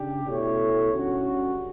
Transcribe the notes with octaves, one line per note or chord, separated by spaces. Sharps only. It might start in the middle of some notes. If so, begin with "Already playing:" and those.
Already playing: C#3 D4 G4
B2 A3 E4 A4 C#5
D3 G3 C#4 F#4